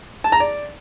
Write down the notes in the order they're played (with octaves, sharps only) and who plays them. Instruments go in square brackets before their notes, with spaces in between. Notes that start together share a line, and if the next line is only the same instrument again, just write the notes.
[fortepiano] A5
A#5
D5